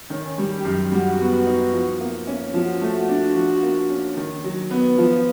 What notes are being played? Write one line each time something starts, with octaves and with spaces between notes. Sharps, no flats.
D#3 C#4
G3
G4
F#2
G3 F#4
B3
D#4
F3
A#3
C#4
F3 F#4
A3
D4
F3
A#3
C#4
D#3
F#3
B3
F3 F4